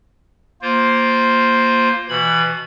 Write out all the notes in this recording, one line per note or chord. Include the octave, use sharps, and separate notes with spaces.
A#3 F4 C5
B2 E3 B5 G#6